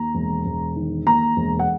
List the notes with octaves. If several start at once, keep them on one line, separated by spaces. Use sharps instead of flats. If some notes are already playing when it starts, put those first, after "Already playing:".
Already playing: D#2 A#5
E1
E1
D#3
D#2 A#5
E1
F#5